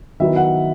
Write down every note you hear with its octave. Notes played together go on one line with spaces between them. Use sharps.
D#3 F#3 B3 E4 E5
F#5